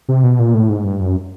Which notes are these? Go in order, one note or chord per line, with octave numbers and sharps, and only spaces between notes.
C3
B2
A#2
A2
G#2
G2
F#2